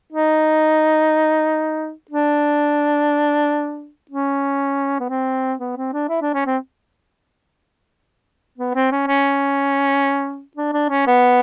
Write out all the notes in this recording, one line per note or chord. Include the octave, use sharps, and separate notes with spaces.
D#4
D4
C#4
B3
C4
B3
C4
D4
E4
D4
C#4
C4
B3
C4
C#4
C#4
D4
D4
C#4
B3